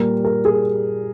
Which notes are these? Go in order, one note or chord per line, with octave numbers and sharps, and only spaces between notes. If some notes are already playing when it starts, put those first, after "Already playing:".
Already playing: A#2 G3 A#4
A#4
G#4